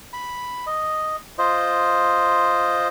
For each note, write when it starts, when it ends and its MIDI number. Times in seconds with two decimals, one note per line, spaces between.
0.13 0.65 83
0.67 1.16 75
1.38 2.88 65
1.38 2.88 72
1.38 2.88 75